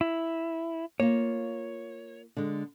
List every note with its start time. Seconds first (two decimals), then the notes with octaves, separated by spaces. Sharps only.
0.01 E4
1.00 A#3 F4 C#5
2.37 D3 G#3